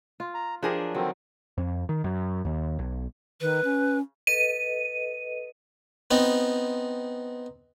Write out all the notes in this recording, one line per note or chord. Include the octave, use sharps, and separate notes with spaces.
F4
A#5
F3 D4 G4 G#4 A#4
F#3
D3 D#3 F#3 C4
F2
D#3
F#2
D#2
B1
D#3 B4
C#4
A4 B4 D#5 D#7
B3 C4 D#4